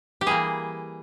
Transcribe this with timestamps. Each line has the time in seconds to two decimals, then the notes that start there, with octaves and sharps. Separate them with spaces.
0.21 G4
0.26 E3 G3 A#3 G#4